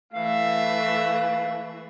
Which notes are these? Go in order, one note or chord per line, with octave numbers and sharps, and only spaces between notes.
E3 A3 E5 F5